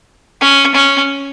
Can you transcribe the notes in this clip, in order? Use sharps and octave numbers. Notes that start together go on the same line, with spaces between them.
C#4
C#4